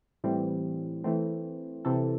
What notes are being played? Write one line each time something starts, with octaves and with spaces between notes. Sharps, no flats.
A2 E3 G3 C4
E3 A3 C4
C3 E3 C4 A4